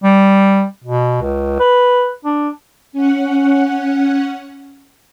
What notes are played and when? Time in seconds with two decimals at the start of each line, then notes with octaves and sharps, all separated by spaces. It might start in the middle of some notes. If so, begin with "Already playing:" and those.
0.04 G3
0.84 B2
1.22 C#2
1.59 B4
2.25 D4
2.93 C#4 F#5